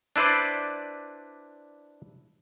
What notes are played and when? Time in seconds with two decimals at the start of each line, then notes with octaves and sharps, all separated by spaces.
0.16 D4 E4 B4 C5 D5